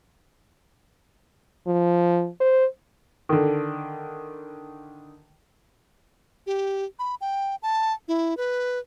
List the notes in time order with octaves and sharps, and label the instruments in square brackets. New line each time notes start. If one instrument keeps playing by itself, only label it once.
[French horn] F3
C5
[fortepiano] D3 D#3
[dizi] G4
B5
G5
A5
E4
B4